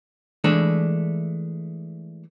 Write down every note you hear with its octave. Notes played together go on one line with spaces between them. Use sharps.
E3 G#3 A3 D4